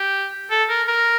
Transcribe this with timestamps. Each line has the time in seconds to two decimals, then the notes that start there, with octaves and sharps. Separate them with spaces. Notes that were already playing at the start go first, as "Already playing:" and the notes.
Already playing: G4
0.50 A4
0.69 A#4
0.88 A#4